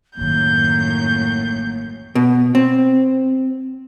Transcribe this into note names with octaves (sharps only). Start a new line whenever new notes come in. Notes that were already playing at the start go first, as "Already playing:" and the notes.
A1 F#2 A2 D#3 A#3 G6
B2
C4